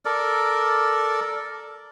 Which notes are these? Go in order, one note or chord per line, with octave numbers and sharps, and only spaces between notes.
A4 A#4 D5